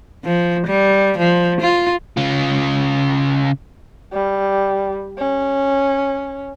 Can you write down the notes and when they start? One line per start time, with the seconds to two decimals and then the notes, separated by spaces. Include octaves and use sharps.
0.24 F3
0.67 G3
1.18 F3
1.61 F4
2.17 C#3 F4
4.13 G3
5.18 C#4